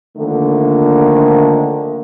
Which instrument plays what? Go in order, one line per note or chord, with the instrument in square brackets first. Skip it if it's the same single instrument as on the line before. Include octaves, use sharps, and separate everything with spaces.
[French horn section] D3 D#3 F3 A3 A#3